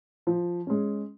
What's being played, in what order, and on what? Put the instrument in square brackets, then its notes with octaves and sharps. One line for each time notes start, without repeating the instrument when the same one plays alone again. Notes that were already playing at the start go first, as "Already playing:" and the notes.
[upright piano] F3
G#3 C#4